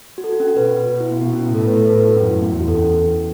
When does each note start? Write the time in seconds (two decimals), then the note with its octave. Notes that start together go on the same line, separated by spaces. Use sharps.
0.18 F#4
0.24 A4
0.33 F#4
0.40 C#4
0.48 F#4
0.57 B2 B4
0.68 B4
0.88 F#4
1.00 E4
1.11 B3
1.21 B2 B3
1.33 C#4
1.43 E4
1.54 A2 A4
1.64 B4
1.76 A4
1.87 B4
1.97 B4
2.08 F#4
2.15 C#4
2.19 F#2 E4
2.31 E4
2.42 B3
2.51 E2 E4
2.60 F#4
2.68 A4
2.77 C#4